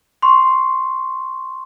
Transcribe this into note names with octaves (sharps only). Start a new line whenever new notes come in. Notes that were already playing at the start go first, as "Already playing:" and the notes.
C6 C#6